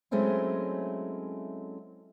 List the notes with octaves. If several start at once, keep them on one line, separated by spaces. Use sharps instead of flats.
F#3 G#3 A3 C4 C#4 E4